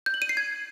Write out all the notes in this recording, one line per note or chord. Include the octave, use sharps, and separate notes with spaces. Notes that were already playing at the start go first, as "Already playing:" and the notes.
G6
F#7
D#7
C7
G#6